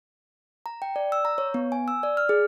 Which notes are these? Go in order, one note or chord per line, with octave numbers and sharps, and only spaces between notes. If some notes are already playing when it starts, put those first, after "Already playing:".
A#5
G5
D5
E6
A#5
C#5
B3
G#5
E6
D5
F6
G#4